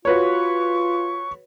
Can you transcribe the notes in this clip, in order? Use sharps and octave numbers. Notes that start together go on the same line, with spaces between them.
F4 F#4 B4 C#5 C#6